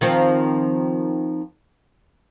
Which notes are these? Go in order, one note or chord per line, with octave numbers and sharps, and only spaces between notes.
D#3 F3 C4